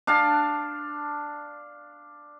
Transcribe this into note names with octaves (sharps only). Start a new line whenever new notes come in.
D4 F5 A5